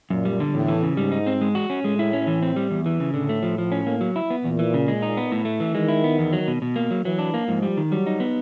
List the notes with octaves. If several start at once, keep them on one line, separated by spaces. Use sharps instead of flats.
F#2 A#2
G3
D3
E2 A2
E3
C#3
G#2 G3
D#4
C4
G#3
F#4
C#4
A2 G#3
E4
C#4
E3
C4
G3
E2
E3
C#3
A2 D3
A3
F3
F3
C#4
A#3
F#3
E4
B3
E2 A#2
E3
C#3
G#3
D#4
B3
A2
A3
E3
D#3 G#3
E4
B3
E2
F#3
B2
B2
A#3
F#3
E3 F#3
D4
A#3
G#2 F3
G3
D#3
F#3 G3
D#4
B3